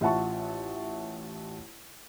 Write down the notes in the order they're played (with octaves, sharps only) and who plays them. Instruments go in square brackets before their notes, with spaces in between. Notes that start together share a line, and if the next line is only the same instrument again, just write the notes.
[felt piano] A1 F4 E5 F#5 A5 C#6